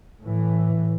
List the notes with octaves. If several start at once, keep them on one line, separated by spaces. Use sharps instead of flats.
A2 E3